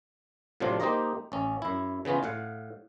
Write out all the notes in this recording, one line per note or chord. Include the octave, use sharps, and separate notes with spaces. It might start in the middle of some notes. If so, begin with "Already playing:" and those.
A2 C3 F3 F#3 D4 F4
A#3 D#4 G4 C5 D#5 A#5
A1 C#4
F#2 E4
C#3 E3 B3 C#4 F4
A2 F5 F#5